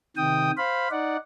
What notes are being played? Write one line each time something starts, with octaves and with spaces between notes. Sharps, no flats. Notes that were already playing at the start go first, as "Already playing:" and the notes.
C3 D#3 G5 D#6
C5 F5 B5
D#4 D5 F#5